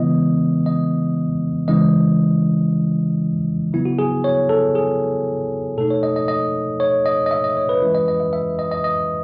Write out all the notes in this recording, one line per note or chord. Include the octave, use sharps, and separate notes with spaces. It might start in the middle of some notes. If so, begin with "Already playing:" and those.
Already playing: C#3 E3 G#3 B3 E4 D#5
D#5
C#3 E3 G#3 C#4 E4 D#5
C#3 F#3 B3 E4
F#4
G#4
C#5
A4
G#4
B2 A3 D#4 A4
C#5
D#5
D#5
D#5
C#5
D#5
D#5
E5
D#5
C#5
B4
E3 G#3 C#4 E4 B4
D#5
D#5
E5
E5
D#5
D#5
D#5